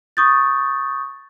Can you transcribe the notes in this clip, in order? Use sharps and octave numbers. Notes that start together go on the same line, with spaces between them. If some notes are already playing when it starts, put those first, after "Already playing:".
C#6 D#6 G6 A6